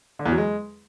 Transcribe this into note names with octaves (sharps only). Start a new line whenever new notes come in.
D3
E2
F#3
G#3